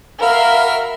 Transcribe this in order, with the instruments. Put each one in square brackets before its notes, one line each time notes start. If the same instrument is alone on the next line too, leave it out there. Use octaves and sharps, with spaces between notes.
[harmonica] F#4 B5 F6 [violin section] A#4 E5 [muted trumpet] F5